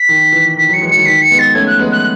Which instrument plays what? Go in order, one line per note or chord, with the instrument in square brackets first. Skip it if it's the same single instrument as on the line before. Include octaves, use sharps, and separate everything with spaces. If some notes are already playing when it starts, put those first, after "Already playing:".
Already playing: [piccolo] B6
[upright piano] D#3
E3
[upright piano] D#3 [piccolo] B6
[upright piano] D#3 F#3 [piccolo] C#7
[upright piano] E3 G#3
[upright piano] D#3 F#3 [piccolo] C#7
[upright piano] D#3 [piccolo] B6
[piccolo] C#7
[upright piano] G#3 B3
[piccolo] A6
[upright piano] A3 C#4 [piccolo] G#6
[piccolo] F#6
[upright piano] G#3 B3
[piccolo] F#6